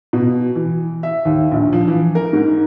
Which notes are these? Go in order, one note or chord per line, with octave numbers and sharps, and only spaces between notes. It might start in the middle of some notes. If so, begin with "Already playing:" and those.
B2
E3
E5
D#2
A#1
F3
E3
A#4
G#2